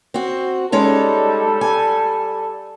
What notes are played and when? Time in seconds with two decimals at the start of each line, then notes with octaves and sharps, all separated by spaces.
0.14 C4 F#4
0.72 G3 G#3 C#4 D#4 A4
1.61 G#5